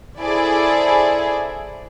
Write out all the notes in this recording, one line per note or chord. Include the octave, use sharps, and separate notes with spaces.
E4 G#4 A4 C5 D5